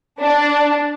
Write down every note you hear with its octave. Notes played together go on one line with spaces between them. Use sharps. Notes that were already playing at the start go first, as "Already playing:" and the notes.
D4